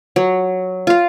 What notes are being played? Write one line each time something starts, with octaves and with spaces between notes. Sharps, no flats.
F#3
F4 F5